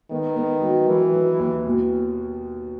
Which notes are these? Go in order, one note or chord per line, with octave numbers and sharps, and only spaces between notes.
D#3 B3
B3
F#3
E3 F#3
F#3
D#2
B2